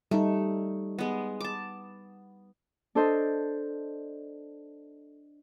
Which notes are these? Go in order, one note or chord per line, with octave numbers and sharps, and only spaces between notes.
G3 A3 D#4
G#3 B3
A5 D6
D4 A4 C5 D#5